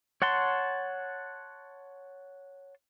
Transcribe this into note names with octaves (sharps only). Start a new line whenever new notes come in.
C#5 F#5 A5 C6